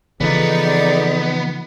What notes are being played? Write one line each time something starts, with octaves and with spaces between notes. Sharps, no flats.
C#3 E3 F3 B3 D#4 G#4 A4 D5